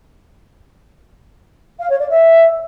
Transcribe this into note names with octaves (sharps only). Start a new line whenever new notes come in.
F5
C#5
D5
E5